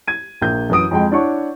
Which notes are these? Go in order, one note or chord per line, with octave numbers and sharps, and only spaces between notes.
G#6 D#7
A#1 A#3 G6
F#2 E3 B4 D#6 D7
F2 G#3 G5
D4 E4 C#5 F#5 C#6